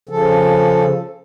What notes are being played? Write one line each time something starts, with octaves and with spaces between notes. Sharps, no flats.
C#3 F3 A4